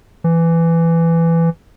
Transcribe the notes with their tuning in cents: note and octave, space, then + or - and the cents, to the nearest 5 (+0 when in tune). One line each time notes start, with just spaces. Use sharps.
E3 +15